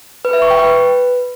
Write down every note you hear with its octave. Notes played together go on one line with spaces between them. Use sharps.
B4
E5
C#6
G5
B4